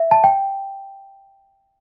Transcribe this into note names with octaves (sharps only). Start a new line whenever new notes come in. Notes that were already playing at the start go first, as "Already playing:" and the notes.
Already playing: E5
A5
G5